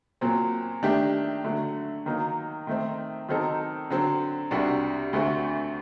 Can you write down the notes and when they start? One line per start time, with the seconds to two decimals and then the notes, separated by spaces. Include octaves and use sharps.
0.21 A#2 F#3 C4
0.82 D#3 A3 D4 G4
1.44 D3 F#3 A3
2.06 D#3 F#3 A#3 D#4
2.67 D#3 A3 C4
3.29 D#3 F#3 C4 D#4 A4
3.90 D3 F#3 C4
4.51 C2 C3 G3 D4 F#4
5.13 D2 D3 A3 C4 F#4